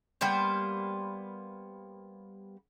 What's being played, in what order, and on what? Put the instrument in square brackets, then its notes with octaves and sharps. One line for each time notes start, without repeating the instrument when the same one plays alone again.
[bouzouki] G3 A#3 B3 C5